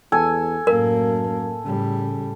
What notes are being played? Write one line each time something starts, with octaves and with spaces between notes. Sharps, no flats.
E2 A4 G#5
F#2 A2 A#3 A#4
A2 C#3 G3